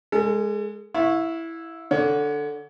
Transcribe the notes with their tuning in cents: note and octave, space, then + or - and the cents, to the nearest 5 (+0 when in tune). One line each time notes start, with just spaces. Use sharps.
G#3 +0 A4 +40
E4 +0 F5 +40 C#6 -10
D3 +0 C#5 +30